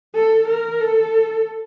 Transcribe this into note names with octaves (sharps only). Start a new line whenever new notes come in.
A4
A#4
A4